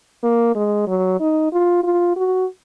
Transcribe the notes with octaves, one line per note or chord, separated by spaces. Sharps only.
A#3
G#3
F#3
D#4
F4
F4
F#4